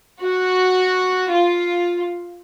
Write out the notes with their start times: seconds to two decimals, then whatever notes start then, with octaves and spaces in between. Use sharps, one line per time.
0.21 F#4
1.31 F4